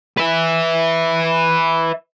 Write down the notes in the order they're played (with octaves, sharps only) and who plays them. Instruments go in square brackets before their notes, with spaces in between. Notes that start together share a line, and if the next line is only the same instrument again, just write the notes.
[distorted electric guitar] B4 E5